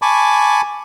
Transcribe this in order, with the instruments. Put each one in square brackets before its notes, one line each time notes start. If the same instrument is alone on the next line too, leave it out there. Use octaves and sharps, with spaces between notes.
[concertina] G#5 A5 B5 C#6 D6